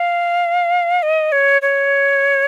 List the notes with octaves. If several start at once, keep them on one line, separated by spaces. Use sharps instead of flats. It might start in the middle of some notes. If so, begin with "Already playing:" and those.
Already playing: F5
D#5
C#5
C#5